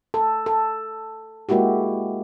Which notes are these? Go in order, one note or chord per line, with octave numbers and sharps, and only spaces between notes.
A4
A4
G#3 A#3 E4 F#4 G4